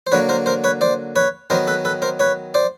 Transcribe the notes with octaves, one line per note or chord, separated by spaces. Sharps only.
C5
D3 F#3 A#3 B4 C#5
A#4 C5
A#4 C5
B4 C#5
C5 D5
B4 C#5
D#3 F#3 B3 A#4 C5
A4 B4
A4 B4
A#4 C5
B4 C#5
C5 D5